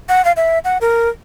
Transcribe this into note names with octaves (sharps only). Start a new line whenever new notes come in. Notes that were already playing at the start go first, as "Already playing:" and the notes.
F#5
F5
E5
F#5
A#4